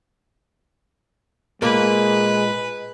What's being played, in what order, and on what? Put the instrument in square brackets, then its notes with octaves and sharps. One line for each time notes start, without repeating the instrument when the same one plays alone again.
[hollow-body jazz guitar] A#2 A#3 [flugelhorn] G#3 [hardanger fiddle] B4